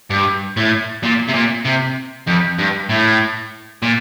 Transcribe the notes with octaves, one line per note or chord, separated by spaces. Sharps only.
G2
A2
A#2
C3
A#2
C3
F2
G2
A2
A#2